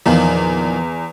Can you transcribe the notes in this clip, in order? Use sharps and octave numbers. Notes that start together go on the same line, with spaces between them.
E2 A#2 D#3 F3